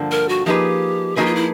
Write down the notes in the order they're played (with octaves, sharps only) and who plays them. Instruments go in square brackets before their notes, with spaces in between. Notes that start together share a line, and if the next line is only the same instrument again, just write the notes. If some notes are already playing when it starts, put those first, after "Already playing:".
Already playing: [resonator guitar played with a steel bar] G2 D3 F3 A#3
[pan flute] A#4
F#4
[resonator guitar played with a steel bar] F3 A#3 D#4 G#4 B4 [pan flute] G4
[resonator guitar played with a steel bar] F3 A#3 D#4 G#4 B4 [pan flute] F#4
[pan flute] F4
E4